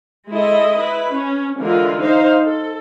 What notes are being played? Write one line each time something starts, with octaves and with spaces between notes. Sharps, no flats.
G#3 E4 A4 D#5
E4 B4
C#4
D3 E3 G#3 F4 A#4
D#4 C5 F5
A4